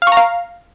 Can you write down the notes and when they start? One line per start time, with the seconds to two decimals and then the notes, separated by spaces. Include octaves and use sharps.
0.02 F5
0.07 C#6
0.12 A#5
0.17 F5